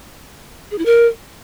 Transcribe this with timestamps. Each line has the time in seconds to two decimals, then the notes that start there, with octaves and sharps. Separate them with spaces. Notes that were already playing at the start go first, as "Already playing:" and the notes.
0.71 G#4
0.78 E4
0.85 A#4